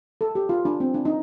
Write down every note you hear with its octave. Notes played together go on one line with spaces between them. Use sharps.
A4
G4
F4
D4
C4
D4
D#4